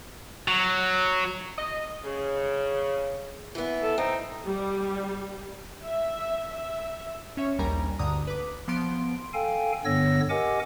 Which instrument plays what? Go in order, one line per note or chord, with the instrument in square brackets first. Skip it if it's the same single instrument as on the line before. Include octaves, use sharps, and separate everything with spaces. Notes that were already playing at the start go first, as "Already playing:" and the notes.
[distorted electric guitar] F#3
[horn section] D#5
C#3
[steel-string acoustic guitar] E3 B3
[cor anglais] A4
[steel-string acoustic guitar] C4 [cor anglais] D#4
[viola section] G3
E5
E5
[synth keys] C#4 C#5 E5
A#1 D#2 G3 A#4 G#5 A#5
D2 G2 D3 A#5 D#6
B4 D6
F3 B3 C6 D7
[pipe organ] A4 F5 G5 G#5
G2 D3 B3 C#5 E6 A#6
G4 A#4 D#5 F#5 G#5 D6